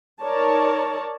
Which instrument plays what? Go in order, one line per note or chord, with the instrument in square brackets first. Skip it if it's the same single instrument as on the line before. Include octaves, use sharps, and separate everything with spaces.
[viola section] D#4 A#4 C#5 D5 A5